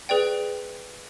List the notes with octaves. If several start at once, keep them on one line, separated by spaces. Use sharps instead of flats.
G#4 B4 D5 G5